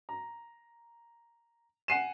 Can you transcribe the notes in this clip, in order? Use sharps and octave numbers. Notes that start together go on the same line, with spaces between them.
A#5
F#5 G#5 C7 D#7 E7